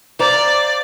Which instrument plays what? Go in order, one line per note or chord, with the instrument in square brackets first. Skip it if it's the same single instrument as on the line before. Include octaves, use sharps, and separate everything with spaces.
[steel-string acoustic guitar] C5 F5 A#5 [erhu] D5